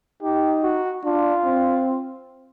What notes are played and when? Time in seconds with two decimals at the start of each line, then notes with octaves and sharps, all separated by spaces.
0.22 D#4 G4
0.63 F#4
1.04 D4 F4
1.45 C4